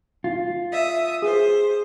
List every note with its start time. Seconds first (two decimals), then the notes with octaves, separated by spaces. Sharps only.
0.24 F4
0.70 E5 D#6
1.22 G#4 C5